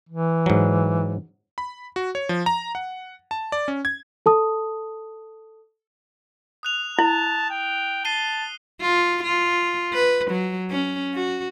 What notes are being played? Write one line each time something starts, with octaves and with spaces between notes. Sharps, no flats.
E3
G#2 F#3
B5
F#4
C#5
F3
A#5
F#5
A5
D5
C#4
G#6
A4 A5 D#6
D#6 F#6 F7
E4 A5
G5
A5 C7 D#7 G7
F4
F4
B4
F#3
C#4
F#4